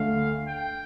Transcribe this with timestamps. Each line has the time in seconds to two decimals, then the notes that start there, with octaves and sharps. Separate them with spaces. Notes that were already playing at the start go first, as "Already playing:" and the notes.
Already playing: D2 D3 A3 F5
0.48 G5